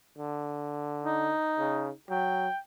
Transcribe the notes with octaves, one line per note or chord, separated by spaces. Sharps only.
D3
D#4
C#3
F#3 G5